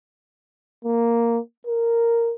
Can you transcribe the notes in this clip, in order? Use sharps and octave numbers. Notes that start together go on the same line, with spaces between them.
A#3
A#4